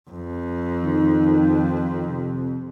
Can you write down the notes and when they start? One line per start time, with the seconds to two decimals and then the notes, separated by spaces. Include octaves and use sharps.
0.11 F2
0.84 D#3
2.07 C3